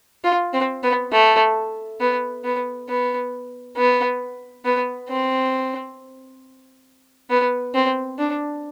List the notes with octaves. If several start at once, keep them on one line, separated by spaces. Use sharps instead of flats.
F4
C4
B3
A3
B3
B3
B3
B3
B3
C4
B3
C4
D4